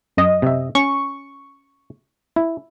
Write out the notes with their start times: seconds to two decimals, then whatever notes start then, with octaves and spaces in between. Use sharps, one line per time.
0.17 F#2 D#5
0.42 C3 E5
0.75 C#4 C#6
2.36 E4